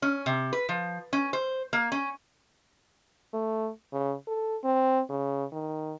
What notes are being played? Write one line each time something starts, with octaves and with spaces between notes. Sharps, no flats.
C#4
C3
B4
F3
C#4
C5
A#3
C#4
A3
C#3
A4
C4
C#3
D#3